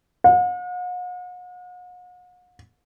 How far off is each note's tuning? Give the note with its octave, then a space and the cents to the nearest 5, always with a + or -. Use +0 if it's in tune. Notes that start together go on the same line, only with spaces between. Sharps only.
F#5 -45